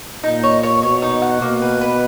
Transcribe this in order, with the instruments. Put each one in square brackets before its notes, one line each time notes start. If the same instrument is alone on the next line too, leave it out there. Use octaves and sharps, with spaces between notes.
[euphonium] A#2 [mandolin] D#4
[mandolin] C#5
C#5
[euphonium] B2 [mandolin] C#5
[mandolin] D#4
F#5
[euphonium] B2 [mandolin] A#3
[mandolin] B4
B4